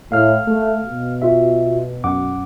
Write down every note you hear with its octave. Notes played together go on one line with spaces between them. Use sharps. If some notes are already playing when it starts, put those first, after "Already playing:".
A2 F5 F6
A3
B2
F4 F#4 E5
F#2 F#5 D6